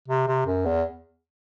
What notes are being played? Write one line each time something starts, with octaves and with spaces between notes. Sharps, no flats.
C3
C3
F#2
E2